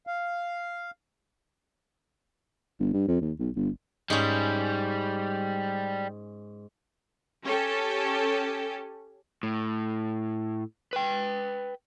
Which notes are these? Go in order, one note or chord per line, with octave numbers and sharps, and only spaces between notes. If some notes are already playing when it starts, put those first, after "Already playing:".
F5
G1
G2
F2
D#2
B1
G1
G#2 G3 C#4
C#4 G4 A4
A2
B4 G5